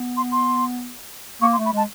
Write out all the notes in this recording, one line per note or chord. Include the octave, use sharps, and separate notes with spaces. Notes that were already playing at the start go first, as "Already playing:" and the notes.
Already playing: B3
C6
C6
A#3 C#6
C6
A3
B5
G#3 A5